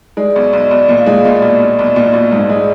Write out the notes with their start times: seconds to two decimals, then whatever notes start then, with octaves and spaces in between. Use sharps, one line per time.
0.17 G#3 D5
0.31 D5
0.36 B1
0.44 D#5
0.53 B1 D5
0.71 B1 D#5
0.88 A#2
0.97 F5
1.06 G#3
1.25 A#2 D#5
1.35 D5
1.42 B1 D#5
1.60 B1
1.79 B1
1.96 A#2
2.13 B1
2.32 G#2
2.49 G#3